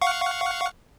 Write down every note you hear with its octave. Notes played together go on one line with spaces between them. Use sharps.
F5 F#5 C#6